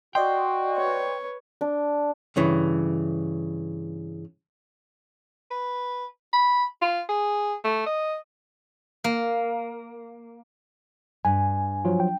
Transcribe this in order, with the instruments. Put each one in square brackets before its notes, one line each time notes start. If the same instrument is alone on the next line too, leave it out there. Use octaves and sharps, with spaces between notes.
[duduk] F#4 [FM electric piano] D5 D#5 C6 [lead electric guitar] G5
[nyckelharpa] B4 C#5
[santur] D4
[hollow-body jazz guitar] G2 C#3 E3
[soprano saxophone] B4
B5
F4
G#4
A3
D#5
[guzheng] A#3
[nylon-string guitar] G2 [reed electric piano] G#5
[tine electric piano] F3 F#3 F4
[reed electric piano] G5